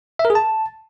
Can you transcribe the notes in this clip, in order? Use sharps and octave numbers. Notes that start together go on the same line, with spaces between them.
E5
A#4
G#4
A5